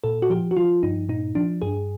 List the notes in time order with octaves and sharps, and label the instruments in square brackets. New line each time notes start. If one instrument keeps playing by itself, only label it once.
[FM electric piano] A#2 A4
F#4
F3 G4
F#4
F3 F4
G2 D#4
A#2 D#4
F3 D4
G2 G#4